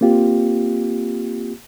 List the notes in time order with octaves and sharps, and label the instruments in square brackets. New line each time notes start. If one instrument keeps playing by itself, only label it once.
[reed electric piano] A#3 C4 F4 G4